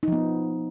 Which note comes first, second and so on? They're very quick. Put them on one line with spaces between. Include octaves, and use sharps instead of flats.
D#4 F3 B3